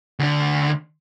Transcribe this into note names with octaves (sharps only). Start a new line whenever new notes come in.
D2 D3